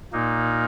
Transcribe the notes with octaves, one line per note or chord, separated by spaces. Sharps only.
A#2 A#3 D#4